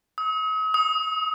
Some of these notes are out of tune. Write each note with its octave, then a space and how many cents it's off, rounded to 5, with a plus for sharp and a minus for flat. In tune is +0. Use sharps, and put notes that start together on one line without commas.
D#6 +45
D#6 +20